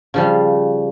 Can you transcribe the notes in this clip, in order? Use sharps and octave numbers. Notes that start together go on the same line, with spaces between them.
C#3 F3 G3